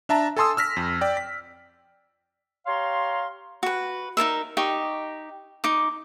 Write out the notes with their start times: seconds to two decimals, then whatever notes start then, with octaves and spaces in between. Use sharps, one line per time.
0.09 D4 E5 A5 A#5
0.36 A4 G#5 A5 C6 D#6 E6
0.57 E6 F6 A#6 B6
0.76 F2
1.01 D5 G5
1.17 B6
2.66 G4 C#5 F5 A#5 C6
3.63 F#4 B4
4.17 D#4 A4 A#4 E5
4.57 D#4 G4 D#5 C#6
5.64 D#4 D6